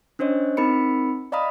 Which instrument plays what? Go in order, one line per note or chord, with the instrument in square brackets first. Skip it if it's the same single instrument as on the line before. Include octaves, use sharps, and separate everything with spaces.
[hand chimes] C#4 D4 C5 C#5 D#5
C4 D#4 A#4 B5 C#7
D5 D#5 F5 A#5 B5 D#6